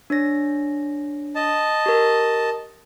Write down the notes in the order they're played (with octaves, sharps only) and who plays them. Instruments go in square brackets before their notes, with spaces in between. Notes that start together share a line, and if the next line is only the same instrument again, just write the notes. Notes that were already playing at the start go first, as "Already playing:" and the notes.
[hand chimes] D4 C#5 A#6
[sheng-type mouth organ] D#5 A5
[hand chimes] G4 A#4